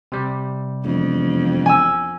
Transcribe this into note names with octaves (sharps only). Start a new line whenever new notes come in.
C3 G3
E1 F2
G#5 E6